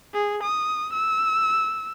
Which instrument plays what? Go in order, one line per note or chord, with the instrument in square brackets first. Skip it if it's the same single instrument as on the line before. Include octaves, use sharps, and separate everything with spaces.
[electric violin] G#4
D#6
E6